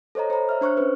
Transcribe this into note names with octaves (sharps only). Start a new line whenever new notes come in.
A4 C5 C#5 D#5 A#5
C5 C#5 A#5 B5
C#5 E5 F6
D4 C5 C#6 F6 F#6
C#4 B4